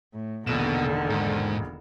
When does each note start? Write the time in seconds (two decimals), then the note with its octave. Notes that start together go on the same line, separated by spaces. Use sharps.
0.13 A2
0.47 E1 A#1 B2 D3 D#3 E7
1.10 G#2